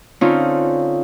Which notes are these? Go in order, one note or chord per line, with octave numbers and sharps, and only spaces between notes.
D3 C4 C#4 D#4 F4